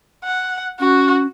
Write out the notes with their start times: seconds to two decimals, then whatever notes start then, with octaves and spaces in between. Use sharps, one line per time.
0.24 F#5
0.80 C#4 F#4